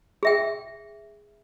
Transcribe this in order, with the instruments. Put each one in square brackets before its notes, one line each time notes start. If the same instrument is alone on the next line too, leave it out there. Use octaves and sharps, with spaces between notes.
[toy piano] G#4 E5 G5